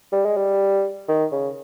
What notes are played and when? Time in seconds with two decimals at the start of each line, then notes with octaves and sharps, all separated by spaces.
0.12 G3
0.25 G#3
0.37 G3
1.08 D#3
1.32 C#3